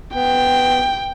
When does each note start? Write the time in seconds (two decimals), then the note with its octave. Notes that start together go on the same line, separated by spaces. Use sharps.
0.15 B3 G5